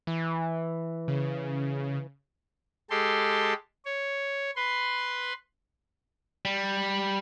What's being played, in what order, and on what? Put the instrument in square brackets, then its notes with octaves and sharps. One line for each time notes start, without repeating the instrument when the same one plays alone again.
[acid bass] E3
[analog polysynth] C#3
[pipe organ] G#3 G4 A4 C6
C#5
B4 C6
[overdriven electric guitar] G3